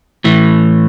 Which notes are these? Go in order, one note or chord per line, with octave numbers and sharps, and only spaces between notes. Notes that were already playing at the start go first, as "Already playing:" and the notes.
A2 E3